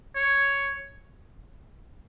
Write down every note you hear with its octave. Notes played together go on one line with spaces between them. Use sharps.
C#5